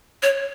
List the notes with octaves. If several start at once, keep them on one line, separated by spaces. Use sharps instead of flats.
C#5